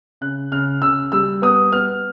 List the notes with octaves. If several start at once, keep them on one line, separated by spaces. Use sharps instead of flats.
C#3 F#6
C#3 F6
C#3 E6
G3 E6
B3 D#6
B3 F6